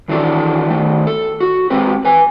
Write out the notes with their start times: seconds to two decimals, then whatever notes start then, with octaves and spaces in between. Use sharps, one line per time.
0.08 D#3 E3 F#3 D4 A4
0.70 D#3 A3
1.07 A4
1.40 F#4
1.70 G#3 C4 G4 B4
2.05 B4 G#5